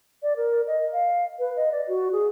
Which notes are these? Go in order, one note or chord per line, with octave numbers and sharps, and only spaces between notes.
D5
A#4
D#5
F5
B4
D#5
D5
F#4
G#4